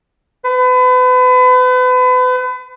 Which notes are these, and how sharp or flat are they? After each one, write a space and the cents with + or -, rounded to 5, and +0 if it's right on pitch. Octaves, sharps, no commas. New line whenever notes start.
B4 +35